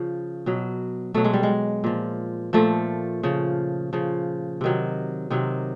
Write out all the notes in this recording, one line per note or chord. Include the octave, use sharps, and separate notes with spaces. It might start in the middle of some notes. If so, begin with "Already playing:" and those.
Already playing: C#3 F3
B2 F#3
B2 F#3 A3
G#3
G3
G#3
A#2 F3
A#2 F3 A3
C#3 F3
C#3 F3
C3 D#3 F#3
C3 D#3 F#3